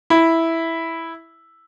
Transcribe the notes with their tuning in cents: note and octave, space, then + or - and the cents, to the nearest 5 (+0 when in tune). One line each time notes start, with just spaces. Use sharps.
E4 -5